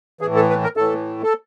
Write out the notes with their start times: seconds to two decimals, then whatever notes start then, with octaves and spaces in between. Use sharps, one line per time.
0.21 E3 G#4
0.25 A2
0.35 A4
0.50 B4
0.63 A#4
0.77 A2 E3 A4
1.23 A4